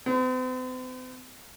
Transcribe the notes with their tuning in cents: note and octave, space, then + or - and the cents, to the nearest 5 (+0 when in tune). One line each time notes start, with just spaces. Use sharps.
C4 -45